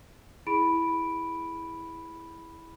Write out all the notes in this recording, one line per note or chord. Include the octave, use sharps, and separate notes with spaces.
E4 G#4 B5 D7